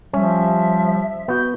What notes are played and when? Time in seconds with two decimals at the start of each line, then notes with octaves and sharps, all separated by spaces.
0.13 F3 G3 C#4 E5
1.28 B3 F#4 G6